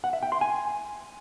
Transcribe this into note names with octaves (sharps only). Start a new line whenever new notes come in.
F#5
E5
G5
C6
G#5